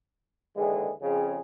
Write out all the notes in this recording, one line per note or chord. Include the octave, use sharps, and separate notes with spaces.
D#2 D3 E3 G#3 G#4
F2 C#3 C#4 G#4